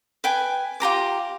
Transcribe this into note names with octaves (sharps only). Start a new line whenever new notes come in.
B4 G5 G#5
F4 G4 A#5 D6